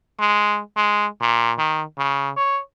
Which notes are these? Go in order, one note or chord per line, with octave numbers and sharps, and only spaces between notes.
G#3
G#3
A#2
D#3
C#3
C#5